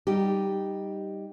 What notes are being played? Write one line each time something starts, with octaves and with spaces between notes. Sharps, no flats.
G3 D#4 G4